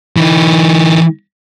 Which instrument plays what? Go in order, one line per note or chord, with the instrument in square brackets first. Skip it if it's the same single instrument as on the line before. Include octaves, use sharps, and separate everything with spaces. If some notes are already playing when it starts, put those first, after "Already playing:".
[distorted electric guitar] E3 D#4